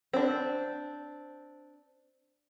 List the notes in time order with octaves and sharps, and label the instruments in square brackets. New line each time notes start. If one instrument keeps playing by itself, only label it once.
[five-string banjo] C4 D4